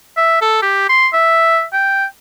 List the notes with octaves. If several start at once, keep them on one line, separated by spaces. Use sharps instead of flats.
E5
A4
G4
C6
E5
G5